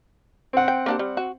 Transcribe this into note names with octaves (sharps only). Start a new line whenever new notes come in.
C4 F#5
G5
A#3 D4 G4
G3
F#4